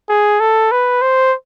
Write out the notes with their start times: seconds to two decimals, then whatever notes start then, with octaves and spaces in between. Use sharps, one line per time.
0.09 G#4
0.40 A4
0.72 B4
1.01 C5